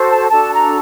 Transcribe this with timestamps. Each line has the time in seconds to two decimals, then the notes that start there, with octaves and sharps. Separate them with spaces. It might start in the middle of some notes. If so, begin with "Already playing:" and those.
Already playing: F#4 A4 C5
0.09 A5
0.30 D4 F#4 A4 A5
0.53 A#5